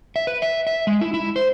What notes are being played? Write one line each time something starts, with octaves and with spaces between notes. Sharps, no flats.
E5
B4
E5
E5
G#3
E4
E4
C5